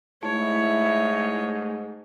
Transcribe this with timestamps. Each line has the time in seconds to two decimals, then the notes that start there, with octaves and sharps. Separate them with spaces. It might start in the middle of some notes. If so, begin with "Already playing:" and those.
0.23 G#2 A3 E4 C#5